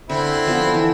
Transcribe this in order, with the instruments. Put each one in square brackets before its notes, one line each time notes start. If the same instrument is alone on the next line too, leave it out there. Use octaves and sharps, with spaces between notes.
[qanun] D3 [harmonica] C4 E4
[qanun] F3 B3 A4
E3